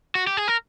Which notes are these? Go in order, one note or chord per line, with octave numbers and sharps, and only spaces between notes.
F#4
G4
G#4
A#4